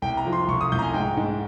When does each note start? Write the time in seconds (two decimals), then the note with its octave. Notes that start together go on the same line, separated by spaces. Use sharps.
0.02 C2 G5
0.17 A#5
0.26 F3
0.33 C6
0.48 C2 C#6
0.61 D#6
0.72 C2 G6
0.79 A#5
0.82 G#5
0.94 G#2 G5
1.17 G#2